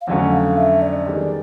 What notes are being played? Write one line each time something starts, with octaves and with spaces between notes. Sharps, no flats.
F5
F2 D3 F#3 A3 C#4 F#5
F5
E5
D5
D#3 G3 B3 D#4 G#4